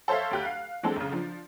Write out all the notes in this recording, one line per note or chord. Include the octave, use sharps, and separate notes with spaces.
A4 C5 C#5 E5 F5
D2 G4 F#6
F5
E3 G#3 C4 D4 A4
B1 C#3
F3 D4